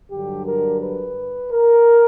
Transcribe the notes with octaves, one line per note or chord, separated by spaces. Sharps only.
G2 D3 F#3 G4
A#4
B4
A#4